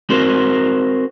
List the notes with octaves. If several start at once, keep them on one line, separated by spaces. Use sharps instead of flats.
C4 F#4 A#4 C5